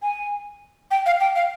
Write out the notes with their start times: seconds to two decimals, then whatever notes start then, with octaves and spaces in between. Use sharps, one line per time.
0.02 G#5
0.91 G5
1.06 F5
1.21 G5
1.35 F5